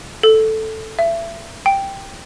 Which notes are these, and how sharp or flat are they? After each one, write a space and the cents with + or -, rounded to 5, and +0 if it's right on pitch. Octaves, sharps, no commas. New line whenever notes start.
A4 +0
E5 +30
G5 +0